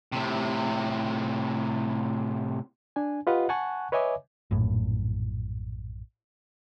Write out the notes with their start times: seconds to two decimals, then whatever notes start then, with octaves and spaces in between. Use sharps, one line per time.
0.12 A2 C3
2.96 D4 G#5
3.27 F4 G4 B4 D#5 F5 F#5
3.49 F#5 G#5 A5 C#6 F#6
3.92 B4 C#5 D#5 E5 G#5 D6
4.51 A#1 F#2 A2